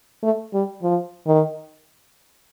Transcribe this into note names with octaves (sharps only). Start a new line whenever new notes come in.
A3
G3
F3
D#3